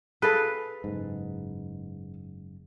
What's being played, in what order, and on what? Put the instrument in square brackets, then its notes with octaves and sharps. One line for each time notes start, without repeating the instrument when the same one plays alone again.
[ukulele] G#4 A4 F5 [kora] B4
[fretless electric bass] F#1 G#2